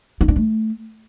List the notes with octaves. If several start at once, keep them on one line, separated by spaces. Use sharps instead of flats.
D#4
D4
A3